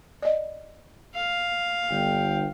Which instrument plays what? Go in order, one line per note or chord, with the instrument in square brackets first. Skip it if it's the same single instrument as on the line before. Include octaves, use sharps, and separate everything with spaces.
[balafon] D5 D#5
[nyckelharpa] F5
[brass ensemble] G1 G5